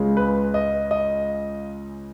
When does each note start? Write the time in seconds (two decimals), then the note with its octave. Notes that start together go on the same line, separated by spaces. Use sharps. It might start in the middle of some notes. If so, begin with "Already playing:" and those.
Already playing: C#2 C#3 G#3
0.17 B4
0.54 D#5
0.91 D#5